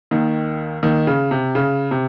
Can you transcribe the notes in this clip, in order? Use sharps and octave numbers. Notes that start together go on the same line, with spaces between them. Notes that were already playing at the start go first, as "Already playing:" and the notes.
D#2 D#3
D#2 D#3
C#3
C3
C#3
C3